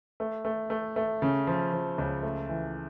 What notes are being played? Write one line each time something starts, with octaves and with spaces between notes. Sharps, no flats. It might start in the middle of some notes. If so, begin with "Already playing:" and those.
A3
A3
A3
A3
C#3
F3
F3
C#2
A3
E3